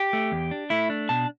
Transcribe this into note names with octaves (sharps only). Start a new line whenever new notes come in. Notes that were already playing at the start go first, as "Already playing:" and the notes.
Already playing: G4
A3
E2
D4
A3 E4
D4
B2 A5